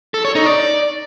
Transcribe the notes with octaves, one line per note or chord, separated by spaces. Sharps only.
A4
C#5
D#4
D5